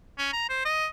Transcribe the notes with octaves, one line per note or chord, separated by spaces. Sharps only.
C#4
A#5
C5
D#5